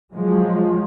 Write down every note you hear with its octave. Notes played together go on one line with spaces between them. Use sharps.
F3 F#3 G#3